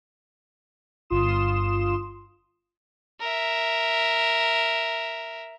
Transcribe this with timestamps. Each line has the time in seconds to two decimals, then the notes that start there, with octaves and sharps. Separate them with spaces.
1.10 G1 F4 C6 D#6 E7
3.20 A#4 E5